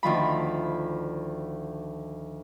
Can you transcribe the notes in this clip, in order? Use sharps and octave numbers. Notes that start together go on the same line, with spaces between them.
D2 D#3 F3 B5